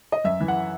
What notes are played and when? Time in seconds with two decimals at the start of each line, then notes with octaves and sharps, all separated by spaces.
0.12 D#5
0.24 F#2 E5
0.41 E3
0.48 F#5